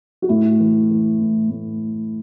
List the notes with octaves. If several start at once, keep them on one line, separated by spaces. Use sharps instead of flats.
F#4
A2 E4
E3
E3
A2
A2